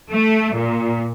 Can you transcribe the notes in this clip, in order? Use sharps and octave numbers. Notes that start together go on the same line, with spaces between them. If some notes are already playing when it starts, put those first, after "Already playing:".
A3
A#2